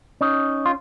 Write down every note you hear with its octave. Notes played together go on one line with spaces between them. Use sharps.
C#4 D#4
F4